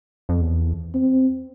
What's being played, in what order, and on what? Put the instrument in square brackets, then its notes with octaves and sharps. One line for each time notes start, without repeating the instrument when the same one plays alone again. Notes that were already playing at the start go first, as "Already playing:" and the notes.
[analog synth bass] F2
E2
[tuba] C4